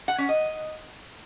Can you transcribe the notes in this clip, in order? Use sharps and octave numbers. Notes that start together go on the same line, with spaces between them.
F#5
C#4
D#5